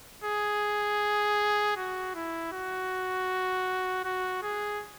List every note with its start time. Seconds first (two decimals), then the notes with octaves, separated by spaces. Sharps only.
0.24 G#4
1.76 F#4
2.15 E4
2.52 F#4
4.05 F#4
4.42 G#4